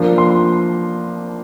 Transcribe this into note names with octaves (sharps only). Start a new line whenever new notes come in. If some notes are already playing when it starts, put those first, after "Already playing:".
Already playing: F3 A#3 D4
C6